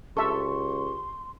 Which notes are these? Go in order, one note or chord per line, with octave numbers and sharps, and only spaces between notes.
C#2 G4 A4 E5 C6 C#6